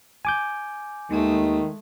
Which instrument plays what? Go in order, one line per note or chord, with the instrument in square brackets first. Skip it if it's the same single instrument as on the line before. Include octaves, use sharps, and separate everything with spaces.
[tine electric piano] G#5 D6 G6
[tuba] D#2 [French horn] D#3 [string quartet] G#3 A3